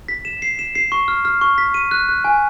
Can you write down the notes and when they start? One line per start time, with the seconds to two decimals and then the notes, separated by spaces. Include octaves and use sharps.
0.08 B6
0.25 E7
0.42 C7
0.59 E7
0.75 C7
0.92 C#6
1.08 F6
1.25 F6
1.41 C#6
1.58 B6
1.74 D#7
1.91 F#6
2.09 F#6
2.25 G#5